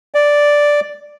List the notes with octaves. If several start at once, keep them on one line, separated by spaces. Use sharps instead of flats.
D5